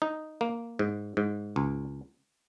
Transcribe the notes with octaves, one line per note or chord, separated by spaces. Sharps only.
D#4
A#3
G#2
G#2
C#2